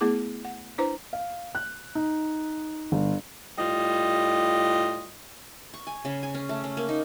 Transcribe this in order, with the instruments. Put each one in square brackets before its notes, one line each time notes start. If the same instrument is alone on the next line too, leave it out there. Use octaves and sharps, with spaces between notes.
[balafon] A3 B3 E4 G#4 D6
F#5
D4 E4 B4 C5 A#5
[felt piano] F5
F#6
D#4
G1
[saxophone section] A2 G3 F4 D#5
[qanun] C#6
G#5
C#3
G#5
C#4
A3
C#4
A#3
D#4